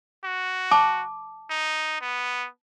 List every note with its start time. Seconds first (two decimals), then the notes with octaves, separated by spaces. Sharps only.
0.25 F#4
0.71 A5 D6
1.50 D#4
2.01 B3